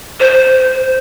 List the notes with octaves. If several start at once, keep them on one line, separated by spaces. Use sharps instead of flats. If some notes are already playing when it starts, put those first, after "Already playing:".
C5